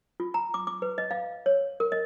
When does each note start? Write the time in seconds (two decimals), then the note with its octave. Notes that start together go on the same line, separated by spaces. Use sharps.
0.20 F4
0.34 A#5
0.54 D6
0.67 D6
0.82 B4
0.98 D#5
1.11 F5
1.46 C#5
1.80 A#4
1.92 D#5